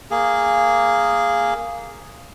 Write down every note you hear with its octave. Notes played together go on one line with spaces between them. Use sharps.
A#3 G#4